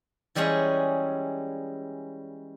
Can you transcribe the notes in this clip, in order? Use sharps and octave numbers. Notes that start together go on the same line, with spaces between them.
E3 G3 G#3 C#4 G#4 C#5